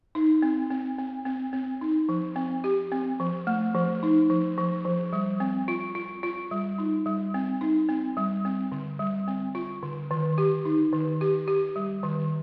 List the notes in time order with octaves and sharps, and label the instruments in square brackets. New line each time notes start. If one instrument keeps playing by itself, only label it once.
[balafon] D#4
C4
C4
C4
C4
C4
D#4
F3
C4
G4
C4
F3
A3
F3
D#4
F3
F3
F3
G3
C4
F4
F4
F4
G3
D#4
G3
C4
D#4
C4
G3
C4
D3
G3
C4
F4
D3
D#3
G4
D#4
D#3
G4
G4
G3
D#3